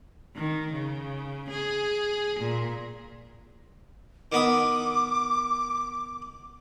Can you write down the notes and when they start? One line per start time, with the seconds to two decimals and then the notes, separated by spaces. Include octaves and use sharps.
0.36 D#3
0.73 C#3
1.50 G#4
2.40 A#2
4.32 D#3 B3 D6 D#6